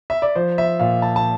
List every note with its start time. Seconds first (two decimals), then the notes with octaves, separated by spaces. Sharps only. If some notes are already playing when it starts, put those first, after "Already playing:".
0.10 E5
0.22 D5
0.36 F3 C5
0.58 E5
0.80 A#2 F5
1.02 A5
1.16 A5